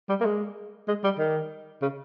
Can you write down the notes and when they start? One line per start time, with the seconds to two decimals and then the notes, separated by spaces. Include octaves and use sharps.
0.09 G3
0.20 A#3
0.25 G#3
0.88 G#3
1.04 G3
1.19 D#3
1.82 C#3